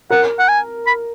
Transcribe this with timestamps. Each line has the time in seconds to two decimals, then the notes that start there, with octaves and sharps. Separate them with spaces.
0.10 A#4 F#5
0.39 F#5
0.49 G#5
0.87 B5